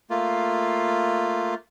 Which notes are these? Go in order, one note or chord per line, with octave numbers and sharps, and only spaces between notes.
A3 A#3 F4